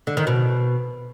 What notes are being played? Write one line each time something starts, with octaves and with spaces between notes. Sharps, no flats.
D3
D#3
B2